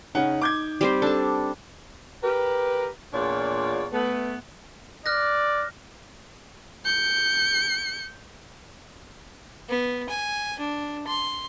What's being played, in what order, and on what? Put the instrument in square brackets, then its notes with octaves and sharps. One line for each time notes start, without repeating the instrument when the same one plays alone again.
[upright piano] C#3 C#4 F#5 [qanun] D#4
[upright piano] D6 G6 G#6
[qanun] G3 C4 C5
[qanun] D4 A5 [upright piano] A4
[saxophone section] G4 A#4 B4
E2 A#2 D4 F4 C#5 D5
A3 B3
[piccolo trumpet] D5 [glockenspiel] F6 F#6 A#6
[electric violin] G6 C#7
[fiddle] B3
G#5
D4
C6